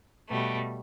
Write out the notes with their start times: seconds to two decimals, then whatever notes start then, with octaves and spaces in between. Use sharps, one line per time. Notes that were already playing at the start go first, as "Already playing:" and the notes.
0.30 B2 G3 A3